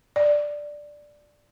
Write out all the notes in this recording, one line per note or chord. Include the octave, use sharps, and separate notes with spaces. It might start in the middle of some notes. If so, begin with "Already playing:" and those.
D5